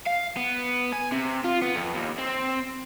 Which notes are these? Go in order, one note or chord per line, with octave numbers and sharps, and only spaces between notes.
F5
B3
G#5
C3
F4
B3
F2
D#2
C4